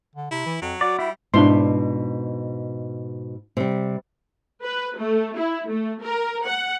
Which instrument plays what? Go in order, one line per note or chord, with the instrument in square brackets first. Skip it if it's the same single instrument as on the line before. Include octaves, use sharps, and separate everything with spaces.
[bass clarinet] D3
[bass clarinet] C3 [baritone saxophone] E4
[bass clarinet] E3
[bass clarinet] F2 [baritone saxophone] F#3
[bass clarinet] F#4 [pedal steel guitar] D5
[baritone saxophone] G3 [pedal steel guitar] E4
[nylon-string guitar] G#2 B2 [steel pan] D4 E4 C6
[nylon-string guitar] C3 G3
[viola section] B4
A3
E4
A3
A#4
F#5